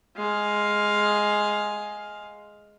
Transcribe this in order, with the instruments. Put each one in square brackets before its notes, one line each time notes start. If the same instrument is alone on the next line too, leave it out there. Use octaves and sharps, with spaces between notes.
[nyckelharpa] G#3 F5